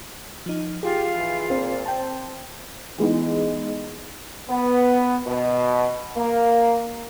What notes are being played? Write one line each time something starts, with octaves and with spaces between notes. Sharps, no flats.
F3 D#4
F4 G4 G#4
E3
A#2 C4
C5 G5 A5
E3 G#3 B3 D#4
B3
B2
A#3